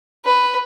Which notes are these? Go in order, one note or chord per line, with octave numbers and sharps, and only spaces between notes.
B4